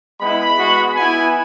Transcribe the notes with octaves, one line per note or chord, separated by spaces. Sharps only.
G#3 B3 E4 B5
G#3 B3 F#4
B3 E4 G#5